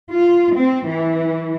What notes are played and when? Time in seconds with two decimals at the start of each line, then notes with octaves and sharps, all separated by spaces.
0.10 F4
0.55 C4
0.86 E3